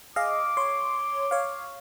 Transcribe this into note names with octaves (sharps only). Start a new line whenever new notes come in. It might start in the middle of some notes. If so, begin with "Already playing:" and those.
G#4 D#5 F5 D6
C#5 C6
C#5 F5